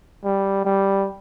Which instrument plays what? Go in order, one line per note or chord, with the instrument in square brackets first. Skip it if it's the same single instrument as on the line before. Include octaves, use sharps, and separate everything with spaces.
[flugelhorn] G3
G3